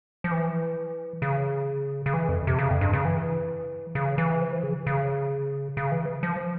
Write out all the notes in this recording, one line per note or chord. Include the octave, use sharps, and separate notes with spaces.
F3
E3
C#3
C#3
E3
F2
C3
C#3
F2
G2
C#3
E3
C#3
E3
F3
E3
C#3
C#3
C#3
E3
F3